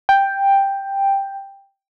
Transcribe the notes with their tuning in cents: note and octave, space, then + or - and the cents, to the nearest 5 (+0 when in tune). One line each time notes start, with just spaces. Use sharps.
G5 +5